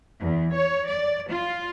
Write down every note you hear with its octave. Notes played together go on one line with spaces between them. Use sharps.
E2
C#5
D5
F4